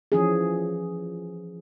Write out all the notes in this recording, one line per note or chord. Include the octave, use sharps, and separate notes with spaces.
E3 F3 C#4 G#4